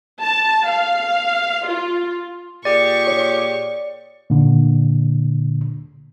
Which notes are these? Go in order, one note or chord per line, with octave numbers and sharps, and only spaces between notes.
A5
F5
F4
A#2 G4 G#4 D5 C#6
C#5
A#2 D3